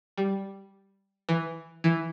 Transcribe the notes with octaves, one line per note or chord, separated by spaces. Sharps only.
G3
E3
E3